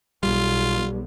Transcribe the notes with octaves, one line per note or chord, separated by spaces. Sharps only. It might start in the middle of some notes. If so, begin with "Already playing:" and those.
B1 B2 G3 F4